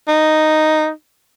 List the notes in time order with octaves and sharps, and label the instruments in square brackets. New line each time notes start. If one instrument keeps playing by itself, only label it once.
[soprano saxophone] D#4